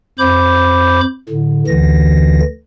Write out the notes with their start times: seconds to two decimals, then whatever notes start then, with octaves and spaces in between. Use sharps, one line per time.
0.19 F2 C5 B5 D6 G6
1.29 A2 D3
1.67 D2 D3 E3 A#6